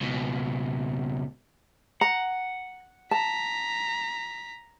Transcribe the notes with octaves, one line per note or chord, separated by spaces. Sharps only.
C#2 B2
F#5 A#5
A5 A#5 B6